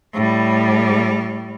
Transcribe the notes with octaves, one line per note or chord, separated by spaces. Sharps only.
A2 G3